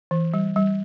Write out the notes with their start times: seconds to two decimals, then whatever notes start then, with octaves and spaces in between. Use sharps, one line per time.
0.11 E3
0.34 G3
0.56 G3